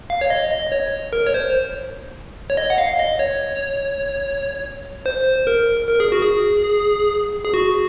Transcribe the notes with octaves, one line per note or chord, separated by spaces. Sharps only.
F5
C#5
D#5
D#5
C#5
A#4
C#5
C5
C#5
D#5
F#5
F5
D#5
C#5
C5
A#4
A#4
G#4
F#4
G#4
G#4
F#4